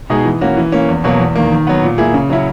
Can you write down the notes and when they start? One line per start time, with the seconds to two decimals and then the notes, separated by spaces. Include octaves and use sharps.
0.10 B2 G#3 D#4 G#4
0.25 E3
0.41 A#3 C#4 F#4
0.57 E3
0.72 A#3 C#4
0.89 E2
1.04 B2 F#3 A#3
1.20 E2
1.36 D#3 A#3
1.52 D#3
1.67 F#3 B3
1.83 A#2
1.98 A#3 E4 G#4
2.14 C#3
2.30 F#3 C#4 E4